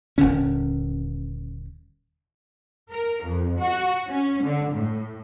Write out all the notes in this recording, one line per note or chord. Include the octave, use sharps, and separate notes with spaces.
D#1 C2 D3 C#4
A#4
F2
F#4
C#4
D3
A2